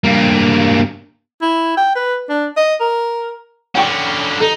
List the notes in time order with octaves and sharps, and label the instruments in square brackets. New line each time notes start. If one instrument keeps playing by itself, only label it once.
[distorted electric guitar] G2 A#3
[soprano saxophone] E4
G5
B4
D4
D#5
A#4
[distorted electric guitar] D3 C#4 [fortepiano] F#5 G5 C#6
[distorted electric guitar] D#4 [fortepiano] A4